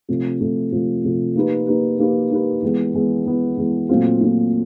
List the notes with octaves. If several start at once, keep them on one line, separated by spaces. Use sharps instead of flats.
C3 F3 A3
C3 F3 A3
C3 F3 A3
C3 F3 A3
A#3 D#4 G4 B4
A#3 D#4 G4 B4
A#3 D#4 G4 B4
A#3 D#4 G4 B4
E3 G#3 B3
E3 G#3 B3
E3 G#3 B3
E3 G#3 B3
A#2 F#3 A3 C4 F4
A#2 F#3 A3 C4 F4